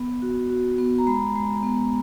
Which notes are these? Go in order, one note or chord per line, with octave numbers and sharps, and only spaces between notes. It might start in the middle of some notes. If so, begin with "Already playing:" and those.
Already playing: B3
F#4
F#4
B3
A#5
G#3 B5
G#3
B3